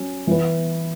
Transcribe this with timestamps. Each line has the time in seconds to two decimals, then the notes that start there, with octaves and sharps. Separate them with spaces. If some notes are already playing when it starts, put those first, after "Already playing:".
Already playing: F#3 C#4
0.27 E3 B3 E4 B4